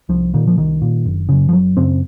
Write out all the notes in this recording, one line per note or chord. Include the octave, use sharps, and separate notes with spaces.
C2 F3
A#2 D#3
F3
C2 D#3
A#2
F#1
F#2 C#3
F3
F#1 F#3
F#2 C#3 C4